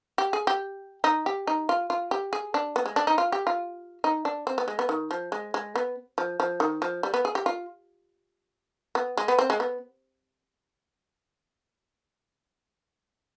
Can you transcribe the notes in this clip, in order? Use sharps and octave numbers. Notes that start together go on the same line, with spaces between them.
G4
G#4
G4
D#4
G4
D#4
F4
F4
G4
G#4
D4
B3
G#3
D4
D#4
F4
G4
F4
D#4
D4
C4
B3
G#3
B3
D#3
F3
G#3
G#3
B3
F3
F3
D#3
F3
G3
B3
G#4
G4
F4
B3
G#3
B3
C4
G#3
B3